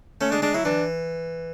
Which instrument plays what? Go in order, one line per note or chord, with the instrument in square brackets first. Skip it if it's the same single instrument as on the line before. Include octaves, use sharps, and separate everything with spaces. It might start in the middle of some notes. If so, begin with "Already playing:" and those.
[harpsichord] A3 [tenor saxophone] C#4
[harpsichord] G#3 [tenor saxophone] D4
[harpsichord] G#3 [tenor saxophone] D4
[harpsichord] F#3 [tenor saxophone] E4
[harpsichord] E3 [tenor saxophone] D4